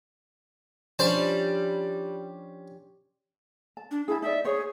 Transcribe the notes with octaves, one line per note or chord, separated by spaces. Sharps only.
F3 G3 C#4 D4 C5 A5
A5
D4
E4 G#4 A5
D#4 D5 E5
G#4 C5 C#5